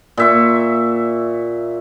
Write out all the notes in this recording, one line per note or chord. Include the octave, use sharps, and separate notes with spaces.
A#2 E5 C#6